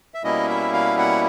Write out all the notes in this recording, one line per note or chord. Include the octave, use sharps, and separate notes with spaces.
E5
B2 G3 A#3 C#4 E4 D#5
E5
F5
F#5